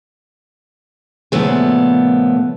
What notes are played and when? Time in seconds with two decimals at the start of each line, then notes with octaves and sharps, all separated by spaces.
1.32 A#2 C#3 F3 A3 B3